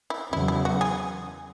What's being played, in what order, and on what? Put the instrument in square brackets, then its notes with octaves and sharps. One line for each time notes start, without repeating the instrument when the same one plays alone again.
[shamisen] E4
[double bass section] E2 C#3 F#3 [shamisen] E4
[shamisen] E4
F#4
G#4